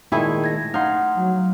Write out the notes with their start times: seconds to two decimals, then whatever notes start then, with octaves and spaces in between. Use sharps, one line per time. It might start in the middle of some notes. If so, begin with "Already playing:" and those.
0.12 A#2 D#3 G#3 A3 E4 G#4 G5
0.44 G#6 A#6
0.74 D#4 F5 F#5 C6 F6
1.16 F#3